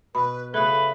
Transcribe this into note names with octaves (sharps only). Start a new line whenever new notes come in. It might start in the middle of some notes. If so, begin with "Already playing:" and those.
B2 B4 B5
C#3 A3 A4 B4 E5